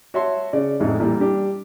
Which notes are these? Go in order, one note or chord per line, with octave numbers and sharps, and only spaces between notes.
F#4 C#5 E5 A5 C6
C#3 D5
A1 F2 G#2 G#3 D#4 A4
A#2 E3 G3
G3 D4 G4